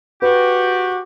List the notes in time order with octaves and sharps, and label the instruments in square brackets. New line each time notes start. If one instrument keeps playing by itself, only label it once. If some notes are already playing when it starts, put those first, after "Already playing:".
[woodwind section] F#4 G4 [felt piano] B4